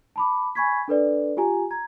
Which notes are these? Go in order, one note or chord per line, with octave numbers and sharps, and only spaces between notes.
A5 B5 D6
G#5 B5 C#6 G#6 B6
D4 A4 B4 D5
F4 G4 G#5 A#5
A#5 G#6